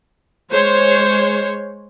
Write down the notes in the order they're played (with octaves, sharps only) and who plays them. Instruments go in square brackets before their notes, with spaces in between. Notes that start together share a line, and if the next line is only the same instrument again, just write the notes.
[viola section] G#3 C5 C#5